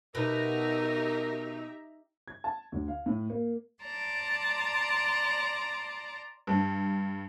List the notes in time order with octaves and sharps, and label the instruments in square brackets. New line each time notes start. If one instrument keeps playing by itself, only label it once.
[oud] B2 [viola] D#4 [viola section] G4 E5 A#5 [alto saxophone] A#4
[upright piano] G#6
A5
D2
F5
A2
A#3
[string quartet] D5 A5 A#5 C6
[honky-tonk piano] G2